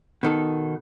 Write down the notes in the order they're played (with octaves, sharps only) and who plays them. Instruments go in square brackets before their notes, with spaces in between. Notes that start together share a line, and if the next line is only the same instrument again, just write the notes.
[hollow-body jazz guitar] B2 D#3 A4